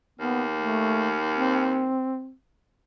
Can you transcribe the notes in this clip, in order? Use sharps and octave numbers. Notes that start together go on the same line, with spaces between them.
D#2 B3
A3
C4